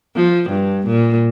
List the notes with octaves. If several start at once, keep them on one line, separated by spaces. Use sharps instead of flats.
F3
G2
A#2